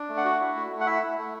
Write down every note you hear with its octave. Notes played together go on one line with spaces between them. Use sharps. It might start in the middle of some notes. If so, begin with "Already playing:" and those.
Already playing: D4
A3
F#5
F#4
E4
A3
A3
F#5
E4 E5
E4
A3